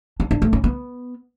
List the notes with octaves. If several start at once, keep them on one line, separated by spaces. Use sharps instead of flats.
D4
D4
A3
C#4
B3